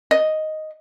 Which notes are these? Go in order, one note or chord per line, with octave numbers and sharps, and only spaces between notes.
D#5